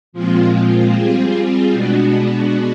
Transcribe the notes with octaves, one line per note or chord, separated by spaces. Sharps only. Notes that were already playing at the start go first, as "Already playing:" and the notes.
A#2 F3 G#3 C4 F4
G3 C4 F4 G#4
B2 G#3 B3 D4 F#4